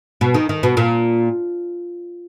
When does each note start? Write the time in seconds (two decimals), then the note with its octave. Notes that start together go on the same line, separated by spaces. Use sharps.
0.21 B2
0.34 D#3
0.49 D#3
0.63 B2
0.77 A#2